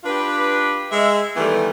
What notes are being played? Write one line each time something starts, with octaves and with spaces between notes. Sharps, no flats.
D4 F4 G4 B4
G#3 E5
D#3 E3 G3 A3 B3